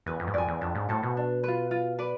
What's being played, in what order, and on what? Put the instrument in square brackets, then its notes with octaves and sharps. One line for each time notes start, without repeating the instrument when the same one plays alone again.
[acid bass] E2 [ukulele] B4
[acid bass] F2
G#2
[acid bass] F2 [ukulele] D5 G#5
[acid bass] E2
[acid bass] F2 [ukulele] D4
[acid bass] G#2
[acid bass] A2 [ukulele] A4 C5
[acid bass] B2
[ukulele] D4
F4 B4
F4
B4 D5